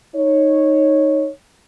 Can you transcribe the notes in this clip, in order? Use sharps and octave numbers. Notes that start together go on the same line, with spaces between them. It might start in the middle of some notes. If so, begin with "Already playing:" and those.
D#4 C#5